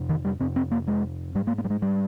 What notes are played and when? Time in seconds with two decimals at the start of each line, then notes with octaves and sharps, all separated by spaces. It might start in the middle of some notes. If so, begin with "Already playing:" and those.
Already playing: F2 C3
0.09 D#3
0.25 G3
0.40 F2 C3 C4
0.56 C4
0.72 A#3
0.88 G#3
1.35 G#2 G3
1.47 A#3
1.58 A#3
1.65 G3
1.70 G#3
1.82 G3